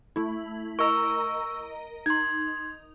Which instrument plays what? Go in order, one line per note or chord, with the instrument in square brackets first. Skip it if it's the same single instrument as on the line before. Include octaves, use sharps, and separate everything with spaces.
[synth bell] A3 E4
[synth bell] A#4 D#5 A#5 [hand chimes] C#6 E6
[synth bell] D#4 [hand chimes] C6 G#6